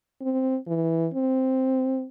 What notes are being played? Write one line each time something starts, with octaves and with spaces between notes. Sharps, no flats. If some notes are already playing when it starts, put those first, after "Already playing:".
C4
E3
C4